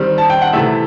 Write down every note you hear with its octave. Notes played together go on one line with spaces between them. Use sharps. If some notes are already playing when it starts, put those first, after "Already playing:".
Already playing: D#3 G3 C4
A5
G5
F#5
C3 E3 A3 E5